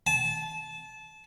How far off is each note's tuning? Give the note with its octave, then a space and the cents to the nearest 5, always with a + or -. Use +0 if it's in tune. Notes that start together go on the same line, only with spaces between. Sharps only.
A5 -25